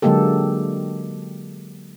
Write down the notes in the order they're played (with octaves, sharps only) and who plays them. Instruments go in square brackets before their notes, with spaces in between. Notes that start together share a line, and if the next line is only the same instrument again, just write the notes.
[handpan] D3 F#3 G#3 A#3 G4 A4